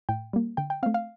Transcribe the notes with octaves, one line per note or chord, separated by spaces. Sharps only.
A2 G5
G3 A#3
D3 G5
G5
A3 C4 F5
F5